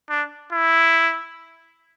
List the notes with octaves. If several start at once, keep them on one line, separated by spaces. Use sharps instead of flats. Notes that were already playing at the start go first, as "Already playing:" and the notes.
D4
E4